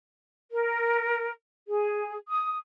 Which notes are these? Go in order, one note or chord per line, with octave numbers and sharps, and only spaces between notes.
A#4
G#4
D#6